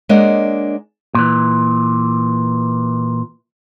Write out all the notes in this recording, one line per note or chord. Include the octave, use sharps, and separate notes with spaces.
G#3 A#3 D4 C#5 D#5 F#5
A#2 E3